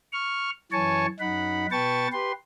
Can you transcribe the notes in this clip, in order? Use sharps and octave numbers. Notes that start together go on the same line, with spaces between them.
C#6 F6
F#2 E3 C#5 G#5 A5 C#6
F#2 D#4 F#5 B5
B2 B4 G5 A5 C#6 A6
G4 B4 C6